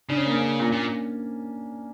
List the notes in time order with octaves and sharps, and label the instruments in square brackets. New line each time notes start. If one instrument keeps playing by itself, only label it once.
[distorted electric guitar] C#3 [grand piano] D4
[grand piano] C#4
A#3
C#4
[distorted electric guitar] A#2
A#2